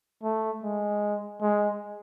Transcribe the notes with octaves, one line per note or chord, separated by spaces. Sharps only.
A3
G#3
G#3